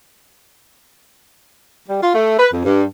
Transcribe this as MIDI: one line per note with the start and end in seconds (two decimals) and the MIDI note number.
1.88 2.01 55
2.03 2.12 65
2.15 2.34 57
2.38 2.48 71
2.52 2.64 41
2.65 2.83 43